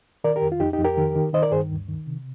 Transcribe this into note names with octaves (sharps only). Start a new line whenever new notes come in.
D#3 A#4 D5
G4 A#4
F2
F4
F2 D#4 G4
D#4 G4
F2
G4 A#4
D#3
D#3
D#3 C5 D#5
A#4 D5
G2 G#4 C5
D2
D#3
C3